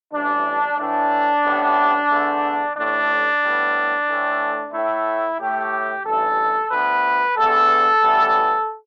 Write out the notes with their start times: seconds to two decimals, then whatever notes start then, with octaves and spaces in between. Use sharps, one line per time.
0.12 A1 G2 E3 D4
0.78 A2 E3 A3 D4
1.44 A1 A2 G3 B3
2.10 E2 D3 A3
2.75 A1 A2 A3 D4
3.42 A2 G3 B3
4.08 A2 E3 A3
4.73 A2 A3 E4
5.39 A2 A3 G4
6.06 A1 G2 E3 A4
6.70 D2 D3 B3 B4
7.36 E2 D3 G3 B3 A4
8.03 A1 A2 E3 G3 B3